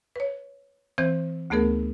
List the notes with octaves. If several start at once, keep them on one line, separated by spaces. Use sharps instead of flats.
B4 C#5
E3 C4 C5 G6
D2 A3 B3 G#4 A#4